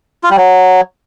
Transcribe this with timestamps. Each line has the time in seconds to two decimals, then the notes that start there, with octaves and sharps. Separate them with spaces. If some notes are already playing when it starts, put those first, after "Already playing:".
0.23 F4
0.30 G3
0.37 F#3